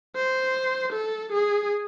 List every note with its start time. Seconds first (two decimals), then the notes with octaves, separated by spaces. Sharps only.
0.16 C5
0.92 A4
1.32 G#4